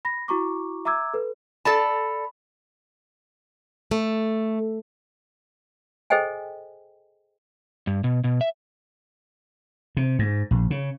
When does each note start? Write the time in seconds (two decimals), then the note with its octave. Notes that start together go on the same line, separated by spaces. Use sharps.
0.05 B5 A#6
0.28 E4 F#4 A#5 C#6 D6
0.85 E5 A#5 D6 E6 G#6
1.14 A4 B4
1.65 A4 D5 A5 B5
3.91 A3
6.10 G#4 A4 C5 D#5 G5 G#5
7.87 G2
8.04 B2
8.24 B2
8.41 E5
9.97 C3
10.19 G#2
10.51 A#1
10.70 C#3